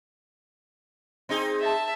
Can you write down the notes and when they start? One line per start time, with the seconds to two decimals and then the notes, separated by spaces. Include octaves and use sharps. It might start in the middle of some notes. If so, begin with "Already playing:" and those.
1.29 C4 D#4 G#4
1.60 E5 A5